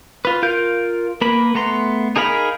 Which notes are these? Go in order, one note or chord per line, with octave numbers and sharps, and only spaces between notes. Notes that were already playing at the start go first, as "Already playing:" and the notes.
F4 B4
F4 A#4 F5 G6
A#3 A#4 B4 B5
A3 B3 A#5 C6
D#4 G#4 A#4 F5 B5